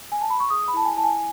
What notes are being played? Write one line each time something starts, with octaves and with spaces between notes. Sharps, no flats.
G#5
A5
B5
C#6
G#4 D#6
B5
E4 A5
G#5
E4 A5
G#5